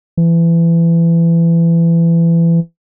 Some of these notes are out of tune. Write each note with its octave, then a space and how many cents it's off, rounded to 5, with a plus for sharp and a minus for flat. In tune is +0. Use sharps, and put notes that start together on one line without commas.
E3 +25